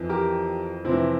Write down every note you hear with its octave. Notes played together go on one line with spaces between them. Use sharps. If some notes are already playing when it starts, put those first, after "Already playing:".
Already playing: F2 E3
G4 A#4
F2 C3 E3 C4 E4